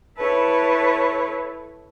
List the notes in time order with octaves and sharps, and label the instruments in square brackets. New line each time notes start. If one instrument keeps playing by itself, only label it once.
[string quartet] E4 A4 B4 C#5